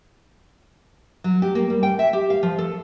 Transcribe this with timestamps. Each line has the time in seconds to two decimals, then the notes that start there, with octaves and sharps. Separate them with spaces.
1.24 F#3
1.42 G4
1.55 A#3
1.70 G3
1.83 G5
1.99 E5
2.13 G4
2.30 F5
2.43 F3
2.58 A4